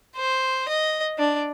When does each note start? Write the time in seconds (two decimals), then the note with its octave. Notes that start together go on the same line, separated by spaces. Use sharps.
0.16 C5
0.68 D#5
1.18 D4